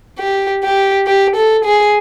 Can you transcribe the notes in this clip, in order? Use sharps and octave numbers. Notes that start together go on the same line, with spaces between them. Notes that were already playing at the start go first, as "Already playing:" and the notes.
G4
G4
G4
A4
G#4